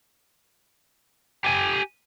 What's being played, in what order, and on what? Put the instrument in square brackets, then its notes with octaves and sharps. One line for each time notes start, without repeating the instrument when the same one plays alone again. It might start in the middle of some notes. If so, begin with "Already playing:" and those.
[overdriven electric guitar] G4 G#5